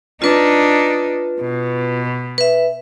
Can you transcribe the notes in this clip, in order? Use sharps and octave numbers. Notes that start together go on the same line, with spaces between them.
D4 D#4 F4 B4
B2
B4 E5